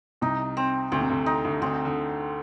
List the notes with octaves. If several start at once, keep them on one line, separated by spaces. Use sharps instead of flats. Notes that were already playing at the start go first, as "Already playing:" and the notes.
C2 C3 D#4
C4
D2 D3 C4
C3
D2 D3
D#4
D2 D3
D2 D3 C4
D3